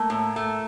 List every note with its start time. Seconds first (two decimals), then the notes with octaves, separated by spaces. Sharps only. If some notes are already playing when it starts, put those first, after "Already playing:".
Already playing: A3 A#3
0.10 A2
0.36 A3